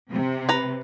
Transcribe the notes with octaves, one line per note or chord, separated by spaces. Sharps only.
C3
B4 A#5